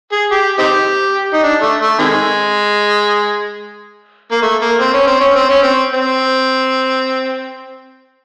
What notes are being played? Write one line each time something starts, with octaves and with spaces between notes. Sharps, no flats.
G#4
G4
C4 D#4 G4
D#4
D4
A3
A3
C3 D#3 G#3
A#3
A3
A#3
C4
C#4
C4
C#4
C4
C#4
C4
C4